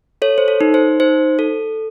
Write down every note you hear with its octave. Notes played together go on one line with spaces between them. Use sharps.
A4 C#5
C5
A4
D#4
C5
D#4 C5
A4